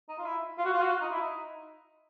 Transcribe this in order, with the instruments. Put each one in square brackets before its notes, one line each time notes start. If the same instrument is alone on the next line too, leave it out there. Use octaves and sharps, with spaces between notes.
[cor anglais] D#4
F4
E4
F4
F#4
F4
F#4
F4
D#4
E4
D#4